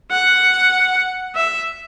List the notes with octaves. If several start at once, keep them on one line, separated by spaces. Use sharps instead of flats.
F#5
E5